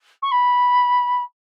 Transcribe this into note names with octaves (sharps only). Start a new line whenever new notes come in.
C#6
B5